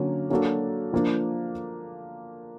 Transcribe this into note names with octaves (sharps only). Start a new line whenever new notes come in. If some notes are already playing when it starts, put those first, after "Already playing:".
Already playing: D3 F#3 A#3 C#4 F#4
F#3 A#3 D4 F#4 A4
F3 A#3 D4